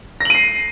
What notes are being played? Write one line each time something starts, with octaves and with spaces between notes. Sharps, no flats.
A#6 C7 D#7 F#7